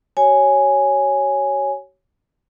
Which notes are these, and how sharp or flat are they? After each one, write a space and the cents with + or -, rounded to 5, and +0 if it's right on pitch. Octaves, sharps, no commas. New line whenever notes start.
F#4 +45 C#5 +0 G#5 +0